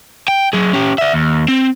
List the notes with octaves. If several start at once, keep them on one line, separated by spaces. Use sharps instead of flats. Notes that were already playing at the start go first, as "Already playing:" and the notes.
G5
F#3 G#4
C#4 G4
D5 E5
D#2
C4